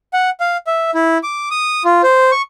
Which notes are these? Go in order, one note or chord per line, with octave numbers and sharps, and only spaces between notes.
F#5
F5
E5
E4
D6
D#6
F4
C5
C#6